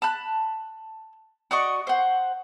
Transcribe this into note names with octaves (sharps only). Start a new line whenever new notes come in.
A5 B5 F#6
F#4 D5 D#5 C#6
C5 F#5